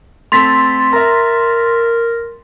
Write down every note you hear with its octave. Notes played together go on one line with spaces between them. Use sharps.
A3 C4 A4 C6 A6 B6
A#4 E5 A#5